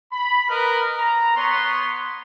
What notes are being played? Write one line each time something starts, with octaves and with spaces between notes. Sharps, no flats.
B5
A#4 B4 D#5
A#5
B3 C#5 C6